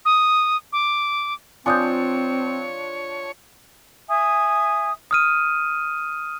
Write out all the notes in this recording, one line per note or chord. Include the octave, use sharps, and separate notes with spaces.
D#6
D6
F3 C4 D4 C#5 G#5 D#6 G6
E5 G#5 D#6
D#6 F6 D#7